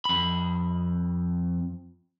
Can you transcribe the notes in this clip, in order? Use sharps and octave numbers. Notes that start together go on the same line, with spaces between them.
F2 B5